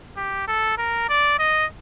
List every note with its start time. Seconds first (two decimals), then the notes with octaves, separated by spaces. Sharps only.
0.16 G4
0.47 A4
0.78 A#4
1.09 D5
1.39 D#5